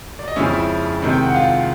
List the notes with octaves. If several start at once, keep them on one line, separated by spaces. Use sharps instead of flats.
D5
D#5
F2 C#3 F3 G#3 C#4 E4 E5
E4 E5
C3 D#3 G#3
G5
F#5
F4 F5